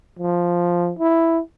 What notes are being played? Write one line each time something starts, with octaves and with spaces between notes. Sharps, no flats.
F3
E4